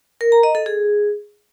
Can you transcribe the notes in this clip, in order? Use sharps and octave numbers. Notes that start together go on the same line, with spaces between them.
A#4
A#5
D#5
A4
G#4